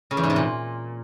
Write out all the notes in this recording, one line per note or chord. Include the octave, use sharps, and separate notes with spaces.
C#3
E2
G#2
C3
A#2